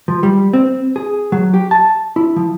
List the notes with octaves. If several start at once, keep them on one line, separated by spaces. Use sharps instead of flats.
F3
G3
C4
G#4
F#3
G4
A5
E4
F3